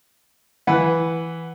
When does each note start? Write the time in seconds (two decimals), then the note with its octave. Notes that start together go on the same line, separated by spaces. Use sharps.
0.67 E3 B4 F#5